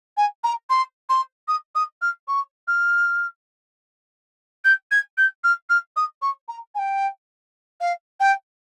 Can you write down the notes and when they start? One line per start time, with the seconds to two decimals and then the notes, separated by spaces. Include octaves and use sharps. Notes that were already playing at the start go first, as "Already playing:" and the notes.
0.17 G#5
0.44 A#5
0.70 C6
1.09 C6
1.48 D#6
1.75 D#6
2.02 F6
2.28 C#6
2.68 F6
4.65 G6
4.91 G#6
5.18 G6
5.44 F6
5.70 F6
5.96 D#6
6.22 C#6
6.48 A#5
6.75 G#5
6.79 G5
7.81 F5
8.20 G5